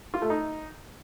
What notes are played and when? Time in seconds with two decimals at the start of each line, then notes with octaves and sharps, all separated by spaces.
0.14 F4
0.22 A3
0.30 D#4